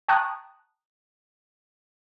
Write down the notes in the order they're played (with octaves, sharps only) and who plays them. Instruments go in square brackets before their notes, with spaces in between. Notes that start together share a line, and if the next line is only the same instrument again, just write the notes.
[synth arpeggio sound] G5 A5 A#5 C#6 D#6 F#6